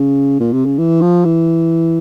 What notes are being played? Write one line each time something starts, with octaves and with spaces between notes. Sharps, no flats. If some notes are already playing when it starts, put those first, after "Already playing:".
Already playing: C#3
A#2
C3
C#3
E3
F3
E3